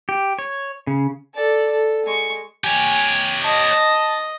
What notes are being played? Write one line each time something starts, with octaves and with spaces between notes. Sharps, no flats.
G4
C#5
C#3
A4 D5
A4
G#3 C#6
G4 C#5 G#5
D#5 A5